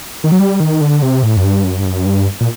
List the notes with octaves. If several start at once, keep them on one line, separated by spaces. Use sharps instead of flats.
D#3
F#3
G3
D#3
D3
C3
A2
F#2
G2
F#2
G2
F#2
G2
A#2